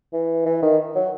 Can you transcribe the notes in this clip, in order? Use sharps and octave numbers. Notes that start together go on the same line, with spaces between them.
E3
E3
D#3
F#3